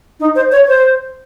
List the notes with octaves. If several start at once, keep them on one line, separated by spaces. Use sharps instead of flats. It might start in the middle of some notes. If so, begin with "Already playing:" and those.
D#4
C5
C#5
C5